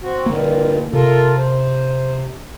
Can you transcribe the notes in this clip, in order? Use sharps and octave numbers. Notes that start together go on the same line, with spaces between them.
C4 F#4
G2 A#2 D3 D#3 A#3
C3 F4 A4 A#4
C5